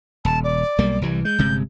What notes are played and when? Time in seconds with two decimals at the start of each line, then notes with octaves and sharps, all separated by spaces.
0.25 D#1 A5
0.44 D5
0.79 B1 G3 A#3
1.02 C2 E3 G3
1.25 G#3 G6
1.38 G1 C3 G#3